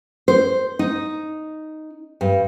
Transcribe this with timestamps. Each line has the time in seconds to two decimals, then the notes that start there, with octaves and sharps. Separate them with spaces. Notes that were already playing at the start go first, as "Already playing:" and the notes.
0.28 C5
0.79 D#4
2.21 G2